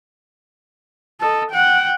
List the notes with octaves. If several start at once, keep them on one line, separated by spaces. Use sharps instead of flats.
A4 D#5
F#5 G5